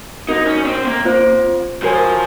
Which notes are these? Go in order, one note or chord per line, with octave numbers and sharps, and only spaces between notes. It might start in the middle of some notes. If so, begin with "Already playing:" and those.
C4 D#4 F#4 A#4
C#4
C4
A#3
C4 F4 C5
F3 F#4 A#4 C#5 G#5